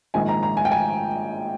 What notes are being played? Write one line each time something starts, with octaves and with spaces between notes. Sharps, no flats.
A#1 G#2 D#3 G#5
A#5
A#5
G#5
G5
G#5